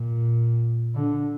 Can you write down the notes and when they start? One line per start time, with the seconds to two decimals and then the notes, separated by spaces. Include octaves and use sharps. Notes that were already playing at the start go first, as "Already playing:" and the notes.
Already playing: A#2
0.95 D3